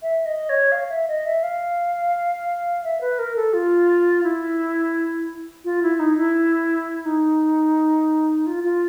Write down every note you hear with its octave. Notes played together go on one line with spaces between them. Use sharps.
E5
D#5
C#5
F5
E5
D#5
E5
F5
E5
B4
A#4
A4
F4
E4
F4
E4
D#4
E4
D#4
F4
F4